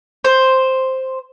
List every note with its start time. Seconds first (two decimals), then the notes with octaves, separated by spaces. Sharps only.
0.25 C5